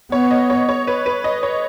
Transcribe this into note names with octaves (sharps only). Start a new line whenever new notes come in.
B3 C#5
D#5
C#5
C#5
B4
B4
D#5
C#5